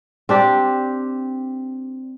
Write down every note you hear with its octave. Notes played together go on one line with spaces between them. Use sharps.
C4 D4 G4